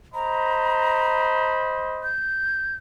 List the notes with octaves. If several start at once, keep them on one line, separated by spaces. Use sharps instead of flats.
C5 D#5 A#5 B5
G6